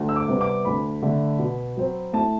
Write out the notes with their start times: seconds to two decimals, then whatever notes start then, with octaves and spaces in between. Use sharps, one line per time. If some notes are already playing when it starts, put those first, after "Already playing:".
Already playing: D2
0.09 E6
0.16 D6
0.28 C3 G3 B3
0.41 D6
0.65 D2 B5
1.02 D3 A3
1.39 B2
1.77 F#3 C4
2.13 A2 A5